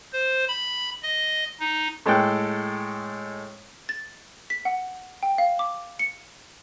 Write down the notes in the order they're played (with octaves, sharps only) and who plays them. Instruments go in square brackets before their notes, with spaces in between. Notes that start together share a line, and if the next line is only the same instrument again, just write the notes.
[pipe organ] C5
B5
D#5
D#4
[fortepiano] A2 G#3 A4 G5 F#6
[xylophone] A6
B6
F#5
G5
F5
D6
C#7